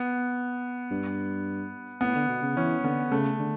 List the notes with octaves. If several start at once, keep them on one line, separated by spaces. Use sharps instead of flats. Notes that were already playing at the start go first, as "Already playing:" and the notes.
Already playing: B3
G2
A2 B3
D3
B2
C#3
E3 C#4
D3 B3
C#3 A3
D3